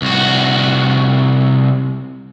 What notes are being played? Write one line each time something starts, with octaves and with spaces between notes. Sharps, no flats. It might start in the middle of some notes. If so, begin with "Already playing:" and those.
C2 F#4